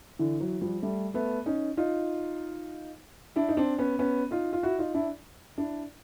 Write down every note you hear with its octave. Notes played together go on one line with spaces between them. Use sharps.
D3 E3
E3 F#3
F3 G3
G3 A3
A3 B3
C#4 D#4
D#4 F4
D4 E4
D#4
C4 D4
B3 C#4
B3 C#4
D#4 F4
F4
E4 F#4
D#4 F4
D4 E4
D4 E4